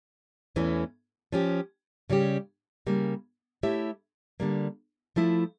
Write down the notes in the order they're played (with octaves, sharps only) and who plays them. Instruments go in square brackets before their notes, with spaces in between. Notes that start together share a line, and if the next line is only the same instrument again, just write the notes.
[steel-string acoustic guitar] E2 E3 A3 C#4
F3 C#4 G4
C#3 G3 C#4 G4
C#3 G3 A#3
A3 E4 G4 C#5 E5
D3 G3 A#3
F3 A3 E4